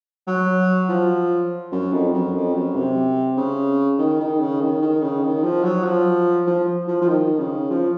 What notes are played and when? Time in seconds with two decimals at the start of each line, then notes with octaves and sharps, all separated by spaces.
0.27 F#3
0.89 F3
1.72 F#2
1.93 F2
2.14 F#2
2.34 F2
2.54 F#2
2.75 C3
3.37 C#3
3.98 D#3
4.20 D#3
4.40 C#3
4.61 D#3
4.82 D#3
5.02 C#3
5.23 D#3
5.43 F3
5.64 F#3
5.84 F3
6.47 F3
6.88 F3
7.02 F3
7.08 D#3
7.39 C#3
7.70 F3